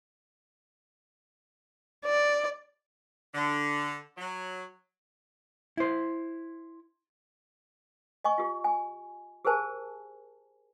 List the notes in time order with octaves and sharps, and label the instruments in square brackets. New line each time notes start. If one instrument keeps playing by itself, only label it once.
[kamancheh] D5
[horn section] D3
F#3
[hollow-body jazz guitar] E4 C5
[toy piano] D#5 G#5 C#6
F4 G4
G#5
G4 G#4 A#4 C5 G#5 A5